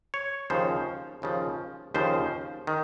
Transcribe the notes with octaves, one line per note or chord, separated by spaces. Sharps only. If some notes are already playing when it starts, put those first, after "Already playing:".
C#5
D#2 C#3 F3 C5
D#2 C#3 F3
D#2 C#3 F3 C5
D#3